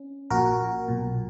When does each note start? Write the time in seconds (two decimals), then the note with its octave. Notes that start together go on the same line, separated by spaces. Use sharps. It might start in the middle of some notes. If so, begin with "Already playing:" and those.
Already playing: C#4
0.30 A#1 A#2 F#4 A#4
0.88 B1 A#2